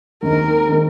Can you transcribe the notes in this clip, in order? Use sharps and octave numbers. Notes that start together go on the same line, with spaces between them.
D#2 D#3 G#3 C4 D#4 A#4
D#3 G#3 C4 D#4